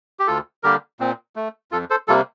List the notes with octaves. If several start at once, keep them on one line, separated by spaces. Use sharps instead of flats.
G4
D2 F4 A4
D3 G3 A#3 G4 A#4
A#2 C4
A3
F2 F4 A4
A4 C5
C3 G3 A#3 F4 A4